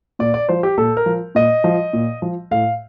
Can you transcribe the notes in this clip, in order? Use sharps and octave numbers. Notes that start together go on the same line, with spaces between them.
A#2 D5
D5
F3 C5
G4
A#2 A4
A#4
F3
A#2 D#5
F3
A#2
F3
A2 F5